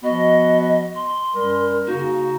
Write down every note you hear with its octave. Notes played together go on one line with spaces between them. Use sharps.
F3 B3 F#4 D#5
C6
F#2 G3 A#4
C#3 A#3 D#4 F#4